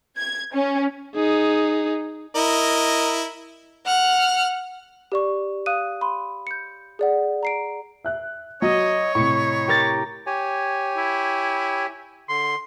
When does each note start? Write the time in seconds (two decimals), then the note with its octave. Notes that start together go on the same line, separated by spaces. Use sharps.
0.18 G#6
0.53 C#4
1.15 D#4 G#4
2.35 E4 A#4 D#5
3.86 F#5 F6
5.12 G4 D5 C#6
5.66 F5 D#6 F#6 D#7
6.01 B5 C6
6.47 G6 C#7
6.99 G#4 D5 F#5
7.43 A#5 C7 D7
8.04 E5 F#6
8.62 F#3 C#5 D#5
9.15 A2 C3 D#5 A#5 B5 C#6
9.68 G4 A#4 A6
10.27 G4 C#5 G#5
10.97 E4
12.29 D3 C6